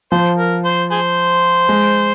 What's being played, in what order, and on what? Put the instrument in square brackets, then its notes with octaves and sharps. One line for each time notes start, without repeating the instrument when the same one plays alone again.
[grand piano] F3 [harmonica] C5
[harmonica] A#4
C5
G#4 C5
[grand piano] G#3